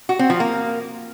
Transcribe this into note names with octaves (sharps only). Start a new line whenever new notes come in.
F#4
C4
F3
A#3